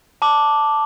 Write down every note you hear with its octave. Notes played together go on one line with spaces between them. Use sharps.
A5 D6